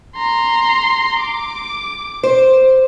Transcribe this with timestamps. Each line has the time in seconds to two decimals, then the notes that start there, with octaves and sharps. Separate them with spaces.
0.16 A#5 C6
1.21 D6
2.23 C5